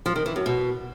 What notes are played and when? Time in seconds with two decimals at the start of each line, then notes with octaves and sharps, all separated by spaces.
0.06 F3
0.16 D#3
0.26 E3
0.36 F#2
0.46 B2